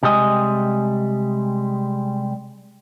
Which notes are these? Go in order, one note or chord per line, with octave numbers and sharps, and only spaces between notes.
C3 G3 G#3 D#5 G#5